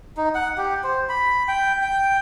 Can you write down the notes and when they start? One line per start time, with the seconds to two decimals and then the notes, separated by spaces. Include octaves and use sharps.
0.17 D#4
0.35 F#5
0.58 G4
0.84 C5
1.09 B5
1.48 G5
1.82 G5